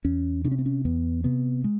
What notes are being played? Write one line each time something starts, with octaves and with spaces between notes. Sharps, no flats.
E2 C#4
C3 D4
C#4
C4
C#4
E2 B3
C3 B3
G#3